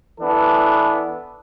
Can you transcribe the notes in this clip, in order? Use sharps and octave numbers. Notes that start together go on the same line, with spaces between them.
E3 B3 D4 A4